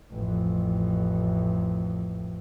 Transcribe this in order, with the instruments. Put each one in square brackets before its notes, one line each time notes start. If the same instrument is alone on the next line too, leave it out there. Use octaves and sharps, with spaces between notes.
[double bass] A1 F2